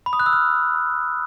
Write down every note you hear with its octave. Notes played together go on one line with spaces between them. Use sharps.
B5
D#6
F#6
E6
F6